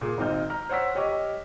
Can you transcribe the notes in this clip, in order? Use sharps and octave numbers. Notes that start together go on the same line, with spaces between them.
A#2 G#4
G#1 C4 D#4 D#5 F6 G6
A#5 F6
C5 C#5 F#5 E6 B6
G4 C#5 D#5 C#6 D6